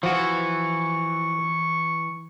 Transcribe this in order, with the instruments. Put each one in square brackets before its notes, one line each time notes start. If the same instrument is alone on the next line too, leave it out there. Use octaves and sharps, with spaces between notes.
[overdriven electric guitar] E3 [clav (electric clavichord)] F3 F#4 [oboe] C#6